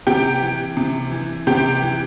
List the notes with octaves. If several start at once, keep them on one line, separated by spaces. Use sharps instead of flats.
C3 G4 G5
E3
C3
E3
C3 G4 G5
E3